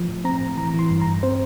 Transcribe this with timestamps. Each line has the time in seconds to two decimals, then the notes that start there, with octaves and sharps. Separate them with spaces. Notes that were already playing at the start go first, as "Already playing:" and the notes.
Already playing: F3
0.09 A2
0.24 C4 A#5
0.41 A2
0.57 E3 A#5
0.74 E3 C6
0.91 G2
1.01 A#5
1.07 G2
1.23 C4 C5